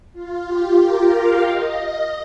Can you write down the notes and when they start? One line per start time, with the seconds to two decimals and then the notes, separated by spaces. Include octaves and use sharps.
0.13 F4
0.47 G4
0.80 A#4
1.13 F5
1.46 D#5